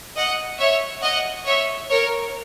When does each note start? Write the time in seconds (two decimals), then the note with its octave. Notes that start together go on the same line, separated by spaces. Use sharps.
0.16 D#5 F#5
0.59 C#5 E5
1.03 D#5 F#5
1.46 C#5 E5
1.90 A#4 C#5